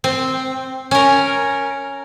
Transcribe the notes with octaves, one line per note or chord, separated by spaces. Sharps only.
C4
C#4 A#4